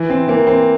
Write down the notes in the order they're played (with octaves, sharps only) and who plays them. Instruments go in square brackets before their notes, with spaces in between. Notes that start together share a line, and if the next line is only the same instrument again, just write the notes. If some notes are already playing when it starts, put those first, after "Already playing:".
Already playing: [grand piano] E3
C4
E3 A#3
C4